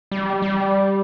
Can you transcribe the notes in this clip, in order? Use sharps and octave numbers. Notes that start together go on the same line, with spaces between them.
G3
G3